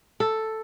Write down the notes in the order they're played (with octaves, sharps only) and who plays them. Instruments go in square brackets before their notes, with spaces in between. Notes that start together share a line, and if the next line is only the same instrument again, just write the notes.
[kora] A4